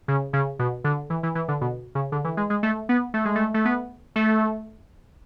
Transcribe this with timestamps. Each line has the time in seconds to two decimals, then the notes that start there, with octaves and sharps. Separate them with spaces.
0.08 C#3
0.33 C#3
0.59 B2
0.84 D3
1.10 E3
1.23 E3
1.35 E3
1.48 D3
1.61 B2
1.95 C#3
2.12 D3
2.24 E3
2.37 G#3
2.50 G#3
2.63 A3
2.89 B3
3.14 A3
3.25 G#3
3.36 A3
3.54 A3
3.65 B3
4.16 A3